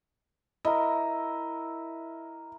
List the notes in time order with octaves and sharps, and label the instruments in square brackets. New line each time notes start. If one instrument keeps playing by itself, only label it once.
[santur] E4 A#4 [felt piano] D#5